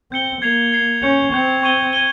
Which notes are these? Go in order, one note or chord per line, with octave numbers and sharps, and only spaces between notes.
C4 G6 C#7 G7
A#3 G#6 C7 F7
G#6 C7 F7
C#4 C#6 G6 C#7 F7
C4 C#6 G6 C#7 F7
C#6 G#6 D#7 G7
G#6 D#7 G7